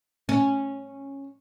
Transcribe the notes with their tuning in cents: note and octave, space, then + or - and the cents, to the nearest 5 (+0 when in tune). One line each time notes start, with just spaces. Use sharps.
C#4 -10